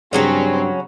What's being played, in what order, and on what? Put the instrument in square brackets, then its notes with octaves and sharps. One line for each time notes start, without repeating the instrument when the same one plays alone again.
[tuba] G2 [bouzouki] C#3 F#3 C#4 [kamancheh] C4